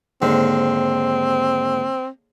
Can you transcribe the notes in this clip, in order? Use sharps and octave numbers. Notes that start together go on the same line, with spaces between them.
D#2 G#2 D3 C4